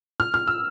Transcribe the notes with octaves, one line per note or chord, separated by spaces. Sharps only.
F6
F6
E6